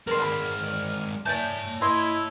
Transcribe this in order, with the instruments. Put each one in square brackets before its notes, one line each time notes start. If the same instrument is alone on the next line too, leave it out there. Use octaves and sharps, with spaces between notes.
[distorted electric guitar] G#3 C4 [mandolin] A#4 D5 C6 [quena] F6
[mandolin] A#3 D5 B5
D5
[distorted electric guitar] C#5 A5 [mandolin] D5 G#5 G6 [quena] E5
[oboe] E4 [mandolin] D#5 E5 C6 [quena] G#6